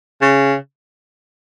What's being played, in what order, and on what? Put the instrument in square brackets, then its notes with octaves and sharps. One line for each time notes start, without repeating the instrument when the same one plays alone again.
[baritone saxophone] C#3